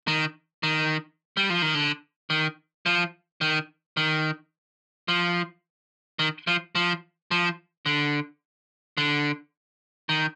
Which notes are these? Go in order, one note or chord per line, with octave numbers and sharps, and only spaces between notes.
D#3
D#3
G3
F3
D#3
D3
D#3
F3
D#3
D#3
F3
D#3
F3
F3
F3
D3
D3
D#3